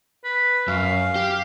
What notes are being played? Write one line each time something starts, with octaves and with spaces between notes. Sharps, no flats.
B4
F#2 F5
G4